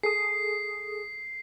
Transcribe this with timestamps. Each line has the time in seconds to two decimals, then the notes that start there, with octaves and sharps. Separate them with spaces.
0.03 G#4 A4 D#6 C7